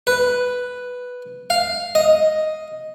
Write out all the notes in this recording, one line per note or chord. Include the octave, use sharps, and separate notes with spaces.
B4
F5
D#5